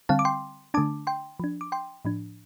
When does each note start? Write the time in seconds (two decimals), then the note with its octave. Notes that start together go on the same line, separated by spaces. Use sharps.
0.09 D3 G3 C4 F5 A5
0.19 D6
0.25 G5 C6
0.74 D3 A3 D4 A5 D6
1.07 G5 C6
1.40 F3 D4
1.61 D6
1.72 G5 C6
2.05 A2 F3 D4